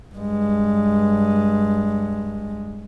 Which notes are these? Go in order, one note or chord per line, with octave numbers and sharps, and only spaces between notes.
G2 G#3